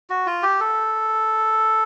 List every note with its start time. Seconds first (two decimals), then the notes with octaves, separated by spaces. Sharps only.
0.10 F#4
0.27 F4
0.43 G4
0.60 A4